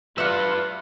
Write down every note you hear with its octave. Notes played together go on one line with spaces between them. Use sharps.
F4 B4 D5 E5 F#5